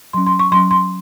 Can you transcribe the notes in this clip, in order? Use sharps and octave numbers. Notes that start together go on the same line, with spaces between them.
F#3 C#4 C6
C6
C#6
F#3 C#4 C6
C6